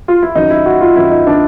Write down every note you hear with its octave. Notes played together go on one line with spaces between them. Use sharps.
F4
E4
F#2 D#3 D#4
E4
F#4
F4
F#2 D#3 E4
D#4
D4